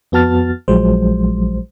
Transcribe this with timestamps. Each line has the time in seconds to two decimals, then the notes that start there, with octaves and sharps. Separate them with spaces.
0.12 F2 B3 F#4 A5 F6 A6
0.68 A#1 F3 F#3 G#3 C5